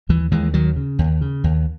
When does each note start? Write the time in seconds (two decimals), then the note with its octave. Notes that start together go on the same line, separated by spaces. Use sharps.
0.09 D#2 E3
0.31 D#2 E3 G#3
0.54 D#2 D#3 F#3
0.76 C#3
0.99 D#2
1.21 C#3
1.44 D#2